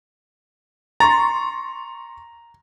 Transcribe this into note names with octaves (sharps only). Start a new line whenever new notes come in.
A#5 C6 C#6 A6